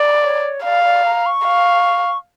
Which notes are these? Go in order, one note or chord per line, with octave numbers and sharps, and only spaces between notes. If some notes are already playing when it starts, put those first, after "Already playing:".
Already playing: D5
C#5
D5 F5
D5
A#5
C#6
F5